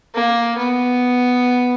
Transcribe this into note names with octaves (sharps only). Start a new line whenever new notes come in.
A#3
B3